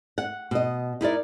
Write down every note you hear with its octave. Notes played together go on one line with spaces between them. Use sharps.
F#5
B2 D#5
D#4 E4 A#4 D5